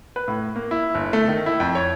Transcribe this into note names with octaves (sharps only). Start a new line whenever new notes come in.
B4
A2
A#3
E4
G1
A3
D#3
E4
F2
C#5